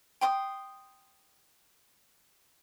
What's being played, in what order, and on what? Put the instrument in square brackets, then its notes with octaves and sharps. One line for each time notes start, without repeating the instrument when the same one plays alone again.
[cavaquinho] G5 C6 D#6